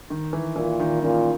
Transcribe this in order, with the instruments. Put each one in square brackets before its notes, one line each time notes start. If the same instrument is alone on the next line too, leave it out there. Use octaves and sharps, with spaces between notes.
[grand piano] D#3
E3
[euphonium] A#2 [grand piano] E3
[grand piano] D#3
[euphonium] A#2 [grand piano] C#3